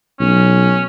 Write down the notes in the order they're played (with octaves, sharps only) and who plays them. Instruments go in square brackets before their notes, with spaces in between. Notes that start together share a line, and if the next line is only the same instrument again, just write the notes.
[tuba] B1 [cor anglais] C#4